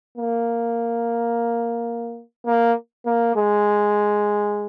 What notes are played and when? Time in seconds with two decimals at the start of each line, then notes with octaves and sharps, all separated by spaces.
0.18 A#3
2.46 A#3
3.06 A#3
3.36 G#3